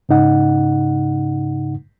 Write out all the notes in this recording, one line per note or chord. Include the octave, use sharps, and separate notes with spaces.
G#2 C#3 D#4 F#5